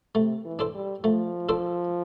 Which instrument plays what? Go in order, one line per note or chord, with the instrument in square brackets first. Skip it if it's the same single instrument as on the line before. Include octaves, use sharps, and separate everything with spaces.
[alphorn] C3 [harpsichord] A3
[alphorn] E3
[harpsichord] D4 A4 C5
[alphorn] G3
[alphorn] F3 [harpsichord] A3
[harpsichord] D4 A4 C5